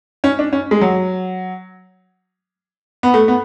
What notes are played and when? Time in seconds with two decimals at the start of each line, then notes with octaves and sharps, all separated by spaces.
0.24 C#4
0.39 D4
0.53 C#4
0.71 G#3
0.81 F#3
3.03 B3
3.14 A3
3.28 B3